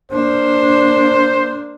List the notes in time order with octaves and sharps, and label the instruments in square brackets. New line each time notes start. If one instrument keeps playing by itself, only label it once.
[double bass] A#3 D4 [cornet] C5